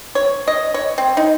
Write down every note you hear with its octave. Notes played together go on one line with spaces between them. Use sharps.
C#5
D#5
C#5
C4
D#4